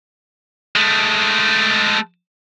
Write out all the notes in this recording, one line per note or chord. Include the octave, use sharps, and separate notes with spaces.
G#3 A3